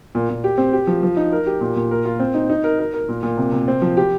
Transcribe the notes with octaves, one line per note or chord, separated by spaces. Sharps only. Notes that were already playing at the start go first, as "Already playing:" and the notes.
A#2
A#2
G4
C4
G4
F3
F3
D#4
A#4
G4
A#2
A#2
A#4
F4
C4
D#4
D#4
A#4
A#4
A#4
A#2
A#2
C3
C3
C4
F3
G4